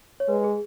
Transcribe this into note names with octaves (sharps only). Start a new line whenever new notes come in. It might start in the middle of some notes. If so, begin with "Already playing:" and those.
C#5
G#3 B4
G#4